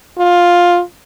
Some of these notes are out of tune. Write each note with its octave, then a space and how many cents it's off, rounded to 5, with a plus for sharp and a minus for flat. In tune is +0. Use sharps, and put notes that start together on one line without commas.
F4 +10